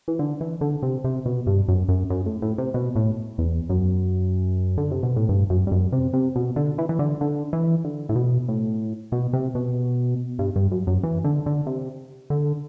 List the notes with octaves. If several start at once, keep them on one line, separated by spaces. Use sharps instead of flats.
E3
D3
E3
D3
C3
C3
B2
G2
F#2
F#2
F#2
A2
A2
C3
B2
A2
E2
F#2
D3
C3
B2
A2
G2
F#2
G2
F#2
C3
C3
B2
D3
E3
E3
D3
D3
E3
D3
A2
B2
A2
B2
C3
B2
G2
G2
F#2
F#2
E3
D3
D3
C3
D3